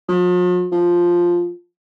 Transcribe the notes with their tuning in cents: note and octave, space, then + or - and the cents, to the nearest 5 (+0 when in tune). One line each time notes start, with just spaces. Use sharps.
F3 +45
F3 +0